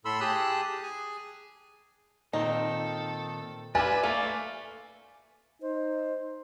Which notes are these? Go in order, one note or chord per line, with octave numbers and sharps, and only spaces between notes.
A2 A4 B5 C6 E6
G4 G#4 A5 D#6 F#6
G#4 G#5
A#2 D#3 C4 D#4 A4
F4 B4 D5 E5 G#5 D6
A3 A#3
D#4 C5